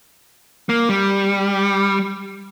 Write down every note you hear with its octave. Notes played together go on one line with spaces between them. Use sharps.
A#3
G3